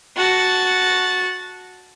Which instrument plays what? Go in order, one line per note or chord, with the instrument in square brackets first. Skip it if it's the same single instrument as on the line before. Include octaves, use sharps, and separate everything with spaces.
[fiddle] F#4 A5